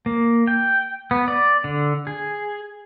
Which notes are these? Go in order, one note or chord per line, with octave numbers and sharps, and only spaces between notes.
A#3
G5
B3
D5
D3
G#4